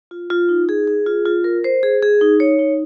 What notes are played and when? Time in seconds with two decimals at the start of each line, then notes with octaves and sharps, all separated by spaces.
0.11 F4
0.30 F4
0.49 D#4
0.69 G#4
0.87 G#4
1.06 F4
1.25 F4
1.44 A#4
1.64 C5
1.83 G#4
2.03 G#4
2.21 D#4
2.40 C#5
2.59 D#4